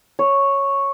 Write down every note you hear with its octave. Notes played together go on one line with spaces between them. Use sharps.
C#5